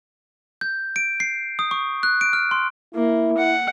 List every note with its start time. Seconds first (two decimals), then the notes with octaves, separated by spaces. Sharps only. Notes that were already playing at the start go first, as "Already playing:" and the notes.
0.61 G6
0.96 D7
1.20 C7
1.59 D#6
1.71 C#6
2.03 F#6
2.21 D7
2.33 F6
2.51 C6
2.95 A#3 E4
3.38 F#5